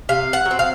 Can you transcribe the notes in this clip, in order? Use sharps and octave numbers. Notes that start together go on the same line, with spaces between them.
C3 F5
F#5
F#3
C4
F5